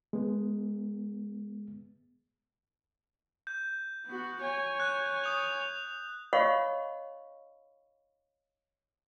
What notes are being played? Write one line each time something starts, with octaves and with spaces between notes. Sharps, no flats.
G#3 B3
G6
B3 F#4
C#5 G#5
F#6 G6
D#6 G6 F7
C#5 D#5 F5 F#5 B5 C#6